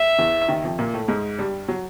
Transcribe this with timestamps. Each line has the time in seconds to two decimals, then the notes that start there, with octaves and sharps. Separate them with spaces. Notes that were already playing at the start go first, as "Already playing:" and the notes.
Already playing: E5
0.19 E2 E3
0.48 D#2 D#3
0.64 F2 F3
0.79 A#2 A#3
0.94 A2 A3
1.08 G#2 G#3
1.39 G2 G3
1.68 F#3